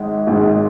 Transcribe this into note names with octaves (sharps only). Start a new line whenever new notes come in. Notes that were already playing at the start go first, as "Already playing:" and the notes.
Already playing: G#1 G#2 G#3
G#1 G#2 G#3